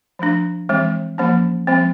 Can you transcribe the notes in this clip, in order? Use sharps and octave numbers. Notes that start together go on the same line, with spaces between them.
F3 A3 D4
E3 G#3 C4
F3 A#3 C#4
F3 G#3 C4